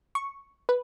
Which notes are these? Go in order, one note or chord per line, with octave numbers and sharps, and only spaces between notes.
C#6
B4